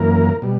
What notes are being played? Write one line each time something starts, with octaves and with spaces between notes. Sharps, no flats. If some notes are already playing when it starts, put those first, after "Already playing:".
Already playing: F#2 E3 A#3 A#4
B2 G3